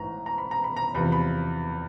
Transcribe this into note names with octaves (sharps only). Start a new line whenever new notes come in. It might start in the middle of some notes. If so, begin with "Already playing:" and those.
Already playing: A1 G#2 E3 A#5
A#5
B5
A#5
B5
A#5
E2 C3 F3 B5
B5